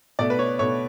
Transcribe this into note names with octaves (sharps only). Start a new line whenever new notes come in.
B2 A3 D5
B4
C#5
B2 A3 C#5